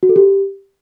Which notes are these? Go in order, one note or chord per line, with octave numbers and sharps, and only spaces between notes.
F#4
A4
G4